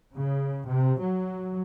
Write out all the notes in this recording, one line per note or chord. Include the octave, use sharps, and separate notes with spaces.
C#3
C3
F#3